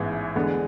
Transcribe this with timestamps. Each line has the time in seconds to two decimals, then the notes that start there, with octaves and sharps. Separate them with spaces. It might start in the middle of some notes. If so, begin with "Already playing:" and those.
Already playing: A1 G#2 E3 B3
0.35 E2 D3 G#3 B3